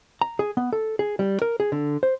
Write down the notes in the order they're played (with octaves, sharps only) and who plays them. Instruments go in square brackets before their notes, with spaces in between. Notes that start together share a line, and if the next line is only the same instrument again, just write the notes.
[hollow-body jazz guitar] A#5
G#4
B3
A4
G#4
G3
A#4
G#4
D3
C5